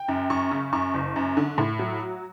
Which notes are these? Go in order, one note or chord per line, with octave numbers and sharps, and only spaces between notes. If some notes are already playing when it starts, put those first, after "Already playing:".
Already playing: G5
F#2
F#2 C#6
C#3
F#2 C#6
F#1
F#2
D3
A2
F#3